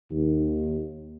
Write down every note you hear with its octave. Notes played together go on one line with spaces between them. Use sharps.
D#2